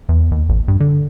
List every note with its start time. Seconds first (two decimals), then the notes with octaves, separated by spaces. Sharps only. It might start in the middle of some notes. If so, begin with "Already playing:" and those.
0.09 E2
0.32 D#2
0.49 A1
0.68 G2
0.80 D3